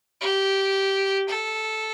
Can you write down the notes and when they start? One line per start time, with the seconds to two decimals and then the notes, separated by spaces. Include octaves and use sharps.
0.21 G4
1.28 A4